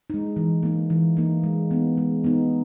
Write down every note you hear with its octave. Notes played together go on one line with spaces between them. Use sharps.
G#3 D#4
E3
A#3 D#4
E3
A#3 D#4
G#3
B3 D#4
G#3
B3 D#4